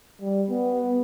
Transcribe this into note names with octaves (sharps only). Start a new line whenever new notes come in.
G3
B3